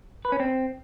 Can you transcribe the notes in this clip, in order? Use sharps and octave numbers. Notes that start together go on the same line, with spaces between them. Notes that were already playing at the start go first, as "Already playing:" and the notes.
B4
C#4
C4